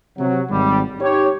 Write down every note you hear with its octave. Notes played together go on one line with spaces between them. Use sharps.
C3 F#3
G#1 G3
D#4 G4 C#5